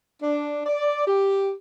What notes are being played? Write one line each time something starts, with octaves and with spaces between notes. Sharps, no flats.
D4
D5
G4